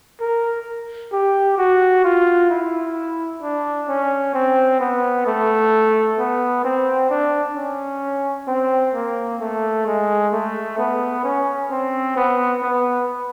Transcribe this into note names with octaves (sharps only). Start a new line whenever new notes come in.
A#4
G4
F#4
F4
E4
D4
C#4
C4
B3
A3
B3
C4
D4
C#4
C4
A#3
A3
G#3
A3
B3
C#4
C4
B3
B3